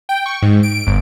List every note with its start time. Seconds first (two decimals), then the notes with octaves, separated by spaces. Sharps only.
0.09 G5
0.26 C#6
0.42 G#2
0.63 D7
0.87 G1